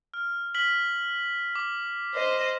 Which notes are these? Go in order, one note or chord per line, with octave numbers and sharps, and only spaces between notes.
F6
F6 B6 F#7
D6
C5 D#5